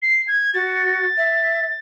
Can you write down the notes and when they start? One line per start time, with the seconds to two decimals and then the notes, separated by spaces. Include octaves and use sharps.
0.02 C7
0.28 G#6
0.54 F#4 A6
1.17 E5